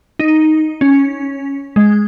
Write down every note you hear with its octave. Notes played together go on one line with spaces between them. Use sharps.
D#4
C#4
G#3